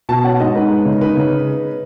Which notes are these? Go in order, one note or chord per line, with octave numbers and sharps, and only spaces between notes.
B2 A5
C#4 F#5
G#2 D#5
D#4 B4
G#3
C#3
D#4 B4
C#3